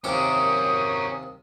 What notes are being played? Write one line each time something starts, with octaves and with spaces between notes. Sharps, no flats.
D#2 C3 C#4 A#4 D6 D#6